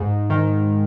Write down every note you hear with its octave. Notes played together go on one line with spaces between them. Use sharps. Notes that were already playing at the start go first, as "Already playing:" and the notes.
Already playing: G#2 G#3
D#3